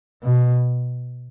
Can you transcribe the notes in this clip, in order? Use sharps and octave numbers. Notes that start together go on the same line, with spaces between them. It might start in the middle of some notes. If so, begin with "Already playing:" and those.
B2